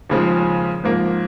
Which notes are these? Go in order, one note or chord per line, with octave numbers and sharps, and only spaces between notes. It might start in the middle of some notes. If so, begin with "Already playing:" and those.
D#2 C#3 F3 G#3
G#2 F3 A#3